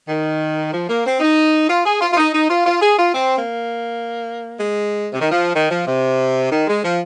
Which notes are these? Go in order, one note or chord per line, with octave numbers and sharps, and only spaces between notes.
D#3
F3
A#3
C4
D#4
F4
G#4
F4
F4
D#4
D#4
F4
F4
G#4
F4
C4
A#3
G#3
C3
D#3
F3
D#3
F3
C3
D#3
G#3
F3